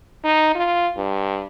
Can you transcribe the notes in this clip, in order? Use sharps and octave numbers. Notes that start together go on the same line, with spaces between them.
D#4
F4
G2